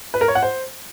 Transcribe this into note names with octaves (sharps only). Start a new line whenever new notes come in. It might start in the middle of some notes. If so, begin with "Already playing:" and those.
B4
A#4
C#5
F#5
C5